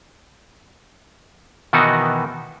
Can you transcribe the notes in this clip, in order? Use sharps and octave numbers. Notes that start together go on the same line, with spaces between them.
B2 D#3 E3 B3 D#4 F#4